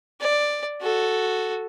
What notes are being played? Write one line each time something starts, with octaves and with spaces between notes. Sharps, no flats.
D5
F#4 A4